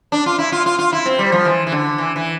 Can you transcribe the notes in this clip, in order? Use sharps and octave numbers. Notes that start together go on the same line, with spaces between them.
D4
F4
E4
F4
F4
F4
E4
C4
G3
F3
E3
E3
D3
E3
E3